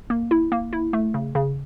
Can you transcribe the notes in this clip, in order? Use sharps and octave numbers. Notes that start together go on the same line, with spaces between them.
A#3
E4
A#3
E4
A3
C#3
C#3